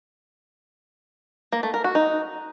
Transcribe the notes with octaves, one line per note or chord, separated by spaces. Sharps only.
A#3
A3
A#4
F#4
D#4